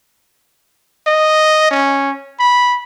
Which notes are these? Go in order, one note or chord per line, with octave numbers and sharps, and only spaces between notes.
D#5
C#4
B5